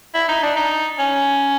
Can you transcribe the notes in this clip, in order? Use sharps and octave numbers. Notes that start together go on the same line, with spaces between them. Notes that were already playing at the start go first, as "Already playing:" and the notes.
E4
D#4
D4
D#4
C#4